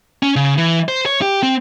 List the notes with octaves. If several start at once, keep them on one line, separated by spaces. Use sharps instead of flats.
C#4
C#3
E3
C5
C#5
G4
C4